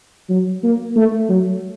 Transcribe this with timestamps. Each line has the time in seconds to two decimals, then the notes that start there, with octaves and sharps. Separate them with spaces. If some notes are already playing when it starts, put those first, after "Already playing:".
0.29 F#3
0.63 A#3
0.96 A3
1.29 F#3